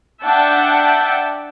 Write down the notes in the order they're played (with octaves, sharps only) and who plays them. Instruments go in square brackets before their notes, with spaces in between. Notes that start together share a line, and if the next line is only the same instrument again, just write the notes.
[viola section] D4 E5 F#5 G5 A5